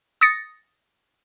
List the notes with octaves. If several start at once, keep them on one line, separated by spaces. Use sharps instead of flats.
D#6 A6 A#6 C#7